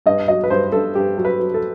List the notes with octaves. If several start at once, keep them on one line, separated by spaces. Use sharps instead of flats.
G2 D#5
F#3 D#5
B4
G2 C5
G2 A4
G2 G4
F#3
B4
F#3
A4